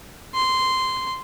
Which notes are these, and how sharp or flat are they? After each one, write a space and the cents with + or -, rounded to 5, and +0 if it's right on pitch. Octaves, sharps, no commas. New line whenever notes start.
C6 -10